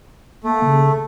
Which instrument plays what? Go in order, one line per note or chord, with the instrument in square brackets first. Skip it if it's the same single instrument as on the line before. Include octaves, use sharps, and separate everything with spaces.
[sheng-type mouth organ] A3 [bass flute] A#3
[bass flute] C#3